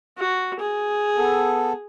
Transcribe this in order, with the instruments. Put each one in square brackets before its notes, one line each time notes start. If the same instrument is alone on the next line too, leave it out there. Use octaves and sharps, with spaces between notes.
[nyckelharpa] F#4
G#4
[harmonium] B3 A4